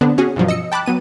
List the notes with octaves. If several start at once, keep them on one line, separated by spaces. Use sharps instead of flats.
D3 B3 C4 D4
C#4 F#4 G#4
G2 B2 F3 F#3
D#5 E6 C#7
G5 A5 B5 D6 F#6
F#3 B3 D#7